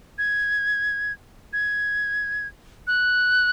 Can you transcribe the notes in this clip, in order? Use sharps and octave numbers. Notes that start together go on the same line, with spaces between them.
G#6
G#6
F#6